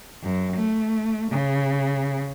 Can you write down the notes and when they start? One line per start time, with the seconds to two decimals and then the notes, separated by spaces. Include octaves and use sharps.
0.23 F#2
0.56 A3
1.32 C#3